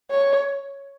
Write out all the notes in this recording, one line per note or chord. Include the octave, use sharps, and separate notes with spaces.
C#5